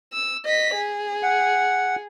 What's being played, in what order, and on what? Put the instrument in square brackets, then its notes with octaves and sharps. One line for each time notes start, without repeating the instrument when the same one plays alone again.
[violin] E6
D#5 B6
G#4
[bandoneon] F#5